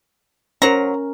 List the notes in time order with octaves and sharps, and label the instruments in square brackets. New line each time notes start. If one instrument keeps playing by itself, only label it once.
[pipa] F#3 C5 A#5 [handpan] C#4 A#4